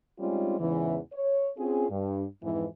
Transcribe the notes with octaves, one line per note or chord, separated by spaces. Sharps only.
G3 G#3 C4 C#4 D#4 F4
E2 G#2 C#3 E3
C#5
C4 C#4 F4 G#4
G2
F2 G#2 E3